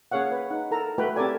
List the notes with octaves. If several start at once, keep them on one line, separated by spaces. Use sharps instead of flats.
A#3 C#4 G#4 C#5 F5 F#5
B4
D#4 F#5
E4 A4 A#4 A#5
A3 E4 F#4 B4 G5
C4 G4 A4 A#4 D5 G#5